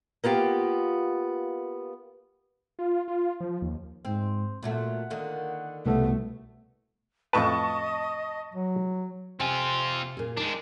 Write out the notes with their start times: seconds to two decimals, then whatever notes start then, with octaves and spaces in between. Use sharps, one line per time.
0.24 A#3 B3 F4 G4
2.79 F4
3.08 F4
3.40 F3
3.62 D#2
4.05 G#2 C4
4.63 A#2 F#3 A3 F#5
5.10 D3 D#3 A#3
5.86 C2 B2 A3 B3 A4
7.33 F2 A2 B4 D#5 A5 C#6
8.54 F#3
9.40 C3 C4 F4 G#5
10.17 A#2 G#4
10.37 G#3 D4 D#4